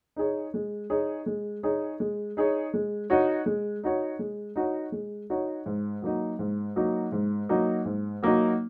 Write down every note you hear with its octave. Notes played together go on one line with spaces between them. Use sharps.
D#4 G#4 C#5
G#3
D#4 G#4 C#5
G#3
D#4 G#4 C#5
G#3
D#4 G#4 C#5
G#3
D#4 F#4 C#5
G#3
D#4 F#4 C#5
G#3
D#4 F#4 C#5
G#3
D#4 F#4 C#5
G#2
F#3 A#3 D#4 F#4
G#2
F#3 A#3 D#4 F#4
G#2
F#3 A#3 D#4 F#4
G#2
F#3 A#3 D#4 F#4